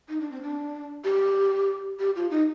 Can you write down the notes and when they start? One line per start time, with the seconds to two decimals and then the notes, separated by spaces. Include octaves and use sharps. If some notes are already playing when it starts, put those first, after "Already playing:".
0.09 D#4
0.20 D4
0.32 C4
0.43 D4
1.05 G4
2.00 G4
2.16 F4
2.31 D#4